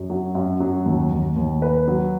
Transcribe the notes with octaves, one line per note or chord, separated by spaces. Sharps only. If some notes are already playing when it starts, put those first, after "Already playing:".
Already playing: F#2
F#3
F#2
F#3
D#2
D#2
D#2
B4
F#3